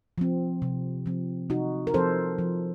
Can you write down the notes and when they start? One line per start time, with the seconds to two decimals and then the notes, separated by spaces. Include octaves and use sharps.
0.18 F3 C4
0.62 C3
1.06 F3 C4
1.50 C3 D#4 F#4
1.87 A#4
1.94 F3 C4 A4 C5
2.39 F3